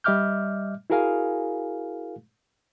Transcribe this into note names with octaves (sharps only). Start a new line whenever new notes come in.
G3 D#5 E5 D6 F6 G6
E4 F#4 G#4 A#4 F5 G#5